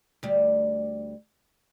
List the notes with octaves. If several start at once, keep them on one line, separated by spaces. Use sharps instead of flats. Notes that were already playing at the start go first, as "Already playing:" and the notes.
D2 G3